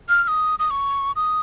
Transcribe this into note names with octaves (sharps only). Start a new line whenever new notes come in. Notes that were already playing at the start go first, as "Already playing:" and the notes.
F6
F6
D#6
D#6
C#6
D#6